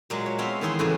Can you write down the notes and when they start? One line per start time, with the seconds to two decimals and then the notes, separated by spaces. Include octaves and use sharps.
0.10 A#2 F#3 G#3
0.26 C#5
0.38 B3 C4 C#5 E5 F5
0.61 D#3 E3 E4 G#4 C6
0.79 A2 C#3 E3 F#3 B3